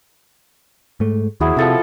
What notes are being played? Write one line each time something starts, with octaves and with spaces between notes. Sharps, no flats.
G#2 A3
D#2 F#3 E4 G#4
C3 F3 A4 E5